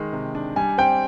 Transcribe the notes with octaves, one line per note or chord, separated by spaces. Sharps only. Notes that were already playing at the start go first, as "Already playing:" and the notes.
Already playing: D#3 G#3
C3
D4
G3 G#5
C4 G5